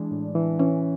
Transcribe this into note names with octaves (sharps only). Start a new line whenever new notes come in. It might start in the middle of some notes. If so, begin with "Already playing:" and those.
Already playing: E3 G#3 D4
A2
E3
E3 C#4